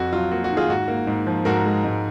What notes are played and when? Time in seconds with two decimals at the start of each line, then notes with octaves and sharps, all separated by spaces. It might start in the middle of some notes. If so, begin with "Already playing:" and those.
Already playing: F2 F#4
0.12 F#3 F4
0.31 A#3 F#4
0.44 F#4
0.50 D#3
0.57 F4 G#4
0.69 G#2 F#4
0.88 A#3
1.07 G#2
1.27 F3
1.45 G#2 F#4 A#4
1.65 G#3
1.84 G#2